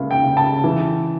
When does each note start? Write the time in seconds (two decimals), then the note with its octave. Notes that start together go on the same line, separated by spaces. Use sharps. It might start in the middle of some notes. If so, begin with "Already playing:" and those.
Already playing: C#2 A#3 E5 F5
0.11 G5
0.24 C#3
0.37 A5
0.64 E3